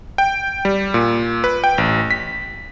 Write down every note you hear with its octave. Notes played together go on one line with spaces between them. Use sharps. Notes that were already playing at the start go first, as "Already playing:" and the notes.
G5
G3
A#2
B4
G5
A1
B6